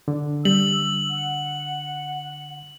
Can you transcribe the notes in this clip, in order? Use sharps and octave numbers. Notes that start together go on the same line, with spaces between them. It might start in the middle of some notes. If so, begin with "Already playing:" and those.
D3
G3 E6 F#7
F#5